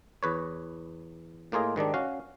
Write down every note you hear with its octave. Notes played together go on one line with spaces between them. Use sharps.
E2 B4 C#5
A2 A#3 F4 G#4 D#5
G#2 D#3 G3 D4
C#4 F#4 F5